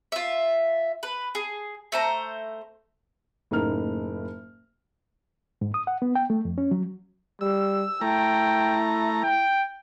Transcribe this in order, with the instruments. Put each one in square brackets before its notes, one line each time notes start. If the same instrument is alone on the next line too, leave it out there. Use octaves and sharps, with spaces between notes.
[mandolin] F4 E5
B4
G#4
A3 C5 A#5
[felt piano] F#1 A2 A#3 D#4 A#4 F6
[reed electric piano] G#2
D#6
F#5
B3
G5
A3
F2
C#4
F#3
[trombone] G3 [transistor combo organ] E6
[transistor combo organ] A3 A#5 [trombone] E4 [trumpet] G5
[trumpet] G5